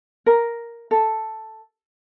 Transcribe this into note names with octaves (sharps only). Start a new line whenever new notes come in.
A#4
A4